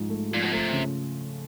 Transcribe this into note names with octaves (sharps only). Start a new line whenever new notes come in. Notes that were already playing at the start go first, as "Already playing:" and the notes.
Already playing: G#2 F3
A3
A#2 F3
B2
C3 A3
C#3